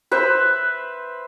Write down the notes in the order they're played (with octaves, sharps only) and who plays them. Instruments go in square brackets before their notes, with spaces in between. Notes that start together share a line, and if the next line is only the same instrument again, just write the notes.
[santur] B4 C5 E5